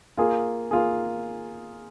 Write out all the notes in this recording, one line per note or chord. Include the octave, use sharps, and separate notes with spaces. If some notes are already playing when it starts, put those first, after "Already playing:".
A#3 F4 G#4
A#3 F4 G#4